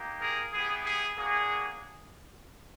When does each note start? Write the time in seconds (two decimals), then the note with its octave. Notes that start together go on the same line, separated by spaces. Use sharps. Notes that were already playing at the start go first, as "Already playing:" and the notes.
Already playing: A#3 D#4 G4
0.21 G#4 A#4
0.53 B3 E4 G4 G#4
0.85 G#4
1.17 A#3 D4 F#4 G#4